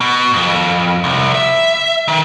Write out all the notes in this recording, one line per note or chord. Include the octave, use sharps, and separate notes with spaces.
B2
F2
C2
E5
D#3